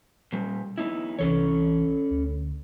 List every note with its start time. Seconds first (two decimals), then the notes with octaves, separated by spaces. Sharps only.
0.33 A#2 G3
0.78 B3 D#4 E4
1.19 C2 E3 C#4 A4 C#5
2.11 D2